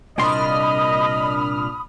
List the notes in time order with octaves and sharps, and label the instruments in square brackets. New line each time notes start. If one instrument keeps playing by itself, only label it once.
[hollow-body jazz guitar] C2 C6 [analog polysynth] A#2 D4 F6 [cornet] D#5 [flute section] B5 D#6